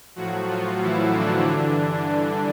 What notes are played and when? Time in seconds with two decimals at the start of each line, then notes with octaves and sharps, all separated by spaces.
0.16 A2 F3 F#3 F#4
0.48 F3 F4
0.80 E3 E4
1.14 D3 D4
1.46 G2 E3